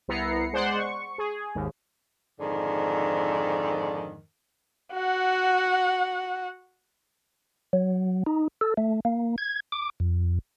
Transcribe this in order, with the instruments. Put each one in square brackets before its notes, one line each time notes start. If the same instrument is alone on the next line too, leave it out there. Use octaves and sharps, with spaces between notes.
[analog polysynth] C2 B3 E4 A#5 C7 C#7
G#3 C5 D5 F#5 C6
C#6
G#4
G#1 D#2
[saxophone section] F2 G#2 D3 D#3
[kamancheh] F#4 F#5
[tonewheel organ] F#3
D#4
A4
A3
A#3
G#6
D6
F2